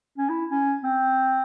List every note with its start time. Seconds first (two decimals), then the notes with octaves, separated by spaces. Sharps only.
0.18 C#4
0.29 E4
0.51 C#4
0.83 C4